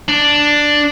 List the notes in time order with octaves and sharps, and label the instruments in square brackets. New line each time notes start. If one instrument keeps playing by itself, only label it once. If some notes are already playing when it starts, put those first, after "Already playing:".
[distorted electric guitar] D4